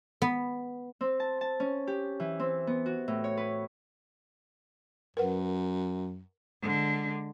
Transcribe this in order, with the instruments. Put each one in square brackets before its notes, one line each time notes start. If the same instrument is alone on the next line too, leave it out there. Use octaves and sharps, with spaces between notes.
[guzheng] B3
[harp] C4
A5
A5
C#4
G4
E3
C4
B3
F#4
A2
C#5
B4
[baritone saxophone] F#2 [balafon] A#4 B4 F#5
[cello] D3 G#3